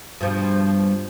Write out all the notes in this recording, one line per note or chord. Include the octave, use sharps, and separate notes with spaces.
G2 B2 F3